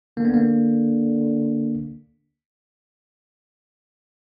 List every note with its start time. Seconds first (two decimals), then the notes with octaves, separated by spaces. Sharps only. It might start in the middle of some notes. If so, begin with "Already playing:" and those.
0.17 D3 A#3
0.25 B3
0.34 A#3